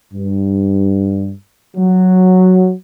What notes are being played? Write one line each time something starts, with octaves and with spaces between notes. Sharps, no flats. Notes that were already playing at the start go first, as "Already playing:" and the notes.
G2
F#3